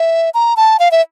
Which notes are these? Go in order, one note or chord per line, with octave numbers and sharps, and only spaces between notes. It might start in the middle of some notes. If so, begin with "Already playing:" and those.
Already playing: E5
A#5
A5
F5
E5